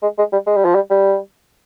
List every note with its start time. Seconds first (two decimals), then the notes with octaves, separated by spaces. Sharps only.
0.03 G#3
0.18 G#3
0.33 G3
0.47 G#3
0.56 G3
0.65 F3
0.75 G3
0.90 G3